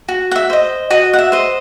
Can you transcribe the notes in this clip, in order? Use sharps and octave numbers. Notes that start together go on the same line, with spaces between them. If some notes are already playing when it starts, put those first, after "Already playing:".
F#4
F#5
E5
C5 D#5
F#4 D#5
F#5
E5
C5 D#5